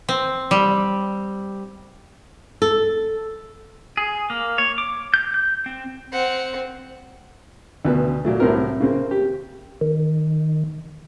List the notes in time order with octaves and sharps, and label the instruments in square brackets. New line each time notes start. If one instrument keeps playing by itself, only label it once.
[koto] C4
G3
[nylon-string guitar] A4
[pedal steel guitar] G#4
A#3
C#5
D6
G6
G6
C4
[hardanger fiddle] C4 F#5
[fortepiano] D2 B2 B4
A#2 F#3 A3
C2 A2 C3 C4 A#4
C#3 A#3 C4
G4
[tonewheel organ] D#3